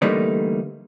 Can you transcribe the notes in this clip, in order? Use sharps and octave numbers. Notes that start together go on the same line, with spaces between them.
D3 E3 G3 A3 A#3 D#4